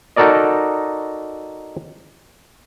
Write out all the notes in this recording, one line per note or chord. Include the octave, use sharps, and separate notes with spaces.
D#4 F#4 A4 A#4 D5 D#5